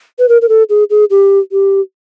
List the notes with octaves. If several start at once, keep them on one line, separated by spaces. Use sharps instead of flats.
B4
A#4
A#4
A4
G#4
G#4
G4
G4